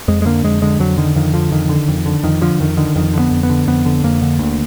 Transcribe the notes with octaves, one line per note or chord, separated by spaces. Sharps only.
F2 G#3
G#3
D3 A#3
F2 G#3
D3 G#3
F2 F#3
D3 D#3
F2 D#3
D3 F3
F2 D#3
D3
F2
D3
F2 D#3
D3 F3
F2 D#3
D3 D#3
F2 D#3
D3
B3
F2
B3
D3
F2 B3
D3
F2 A#3
D3
D2